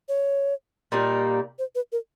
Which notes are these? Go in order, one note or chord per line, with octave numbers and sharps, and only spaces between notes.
C#5
A#2 G3 A#3 D#4
C5
B4
A#4